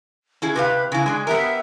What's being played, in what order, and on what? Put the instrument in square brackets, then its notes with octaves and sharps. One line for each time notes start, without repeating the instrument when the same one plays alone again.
[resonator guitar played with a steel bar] C#4 E4 G#4
[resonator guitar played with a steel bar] C3 G4 F5 [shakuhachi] B4
[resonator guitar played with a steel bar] C#3 E4 [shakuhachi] G#5
[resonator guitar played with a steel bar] G#3 D4 G#4
[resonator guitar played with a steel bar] B3 G4 A#4 [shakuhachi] E5